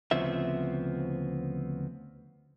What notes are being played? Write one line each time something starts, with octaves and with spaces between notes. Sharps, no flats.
D2 C#3 F3 B3 C4 E5